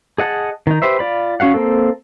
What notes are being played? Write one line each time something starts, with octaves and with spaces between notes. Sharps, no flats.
G#4 D#5 F#5 A5
D#3 D#4
G4 B4 C5 E5
F4 D5 B5
C#4 F#4 F5 F#5
A#3 C4 A4